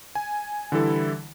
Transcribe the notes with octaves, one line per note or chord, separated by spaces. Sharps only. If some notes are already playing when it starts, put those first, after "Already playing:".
G#5
D3 E3 G3 E4 A4